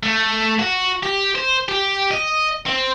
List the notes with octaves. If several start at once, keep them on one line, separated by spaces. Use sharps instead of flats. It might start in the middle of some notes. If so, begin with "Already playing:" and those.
A3
F#4
G4
C5
G4
D#5
C4